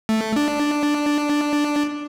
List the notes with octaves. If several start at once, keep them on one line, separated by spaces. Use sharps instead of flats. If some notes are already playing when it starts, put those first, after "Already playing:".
A3
D4